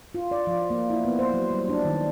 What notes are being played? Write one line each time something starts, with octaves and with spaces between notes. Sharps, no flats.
F4
D5
F3
A#3
E4
B3
C5
F#3
G3
D4
D#3